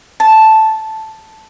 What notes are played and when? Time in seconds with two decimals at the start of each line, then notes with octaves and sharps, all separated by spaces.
0.20 A5